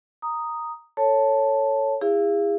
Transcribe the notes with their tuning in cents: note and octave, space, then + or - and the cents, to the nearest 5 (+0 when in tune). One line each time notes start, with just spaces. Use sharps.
A#5 +0 D#6 +0
A4 +15 C#5 +0 A5 +0
E4 +0 G#4 -35 F5 -35